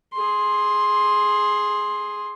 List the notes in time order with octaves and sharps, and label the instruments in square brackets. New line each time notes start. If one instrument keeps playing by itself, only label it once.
[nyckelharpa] G#4 C6